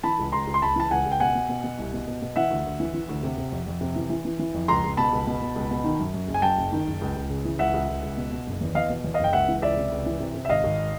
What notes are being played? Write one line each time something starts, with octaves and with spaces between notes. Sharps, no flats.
E3 A5 B5
C#2
C#2 A#5 C6
C#2
C6
C#2 A5 B5
E3 A5
C#2 F#5 G#5
C#2
G5
B2 F#5 G#5
B2
B2
B2
C2
B2
B2
B2
E3 E5 F#5
D2
D2
E3
E3
D2
C3
C3
F2
F2
C3
E3
E3
E3
E3
F2
C#2 A#5 C6
C#2
B2 A5 B5
C#2
B2
B2
C#2
B2
D#3
F#2
F#2
F#1
G#5
F#2 G5 A5
F#1
D#3
F#1
C#2
C#2
C#3
E3
C#2 E5 F#5
C#2
C#2
C#2
B2
B2
F#1
E2
E2 D#5 F5
B2
E2
F#1 D#5 F5
G5
C#2 E5 F#5
E3
C#2 D5 E5
C3
C#2
E3
C3
C3
E5
G#1 D#5 F5
G#1